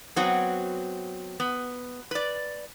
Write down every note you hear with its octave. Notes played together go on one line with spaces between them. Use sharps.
F#3 B3 C4 F#4
B3
B4 D5